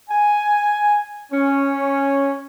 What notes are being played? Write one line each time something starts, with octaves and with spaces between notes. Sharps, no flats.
G#5
C#4